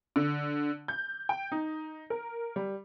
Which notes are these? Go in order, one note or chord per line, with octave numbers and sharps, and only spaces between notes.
D3
G6
G5
D#4
A#4
G3